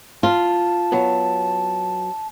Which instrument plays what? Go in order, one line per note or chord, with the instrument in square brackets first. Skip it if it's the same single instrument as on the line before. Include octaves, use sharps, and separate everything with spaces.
[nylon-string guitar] F4 [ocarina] A5
[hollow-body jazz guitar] F#3 B3